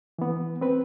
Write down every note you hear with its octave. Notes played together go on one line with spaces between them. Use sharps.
E3 B3
C4 B4